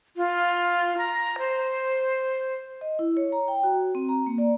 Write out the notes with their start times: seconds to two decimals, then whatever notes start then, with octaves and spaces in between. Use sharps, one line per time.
0.17 F4
0.98 A#5
1.39 C5
2.81 D#5
2.99 E4
3.17 C#5
3.32 A#5
3.48 G5
3.63 F#4
3.95 C4
4.09 A#5
4.27 A#3
4.38 D5